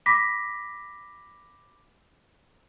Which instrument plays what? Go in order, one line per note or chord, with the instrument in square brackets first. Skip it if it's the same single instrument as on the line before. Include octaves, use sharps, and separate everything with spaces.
[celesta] B5 D6 A#6 B6